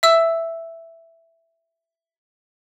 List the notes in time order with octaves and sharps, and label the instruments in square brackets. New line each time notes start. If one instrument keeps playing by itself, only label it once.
[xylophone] E5 E6